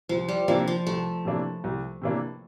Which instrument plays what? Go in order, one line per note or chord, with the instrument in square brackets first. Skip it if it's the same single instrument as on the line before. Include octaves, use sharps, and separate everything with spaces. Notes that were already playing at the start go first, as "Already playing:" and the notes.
[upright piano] C2 [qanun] F3
[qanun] G3
[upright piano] C3 E3 A#3 D4 [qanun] F3
[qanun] F3
[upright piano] C2 [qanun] A3
[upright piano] C3 E3 A#3 D4
C2
C3 E3 A#3 D4